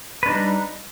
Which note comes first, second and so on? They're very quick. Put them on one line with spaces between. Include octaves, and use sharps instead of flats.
B4 D4 D#4 G3